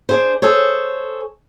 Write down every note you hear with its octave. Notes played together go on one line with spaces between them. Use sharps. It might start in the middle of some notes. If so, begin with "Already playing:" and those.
D4 G#4 C5
G#4 A4 C5 C#5